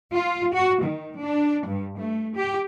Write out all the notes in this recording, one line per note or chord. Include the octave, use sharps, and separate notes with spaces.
F4
F#4
D#3
D4
G2
A3
G4